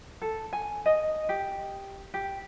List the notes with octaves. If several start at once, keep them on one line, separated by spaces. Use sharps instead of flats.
A4
G#5
D#5
G4
G4